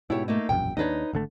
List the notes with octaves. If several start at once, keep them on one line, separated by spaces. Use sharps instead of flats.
G#2 B2 E4 G4 C#5
A3 A#3 D#4
E1 A#1 F#2 G5
D#2 D4 D#4 B4 C#5
G#1 D3 A3